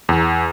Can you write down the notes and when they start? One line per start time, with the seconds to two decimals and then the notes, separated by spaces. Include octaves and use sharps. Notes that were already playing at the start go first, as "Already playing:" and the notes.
0.09 E2